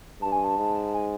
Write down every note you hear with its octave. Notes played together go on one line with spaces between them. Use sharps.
G2 A5
G#5
A5
G#2
G#5